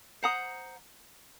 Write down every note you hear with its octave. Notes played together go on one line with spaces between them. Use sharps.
C5 F#5 A#5 D#6